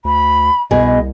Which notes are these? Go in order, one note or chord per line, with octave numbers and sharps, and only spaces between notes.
D2 B5
C2 B2 G#4 D#5